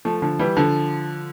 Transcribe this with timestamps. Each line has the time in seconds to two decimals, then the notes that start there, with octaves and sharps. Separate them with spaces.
0.05 F3 A3
0.22 D3 F3
0.39 E3 G3
0.56 D3 F3